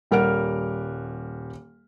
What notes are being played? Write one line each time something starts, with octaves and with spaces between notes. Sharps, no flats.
D#1 G3 A#4 F#5 F6 D7